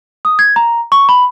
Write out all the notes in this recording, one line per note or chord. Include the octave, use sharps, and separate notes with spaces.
D#6
G#6
A#5
C#6
B5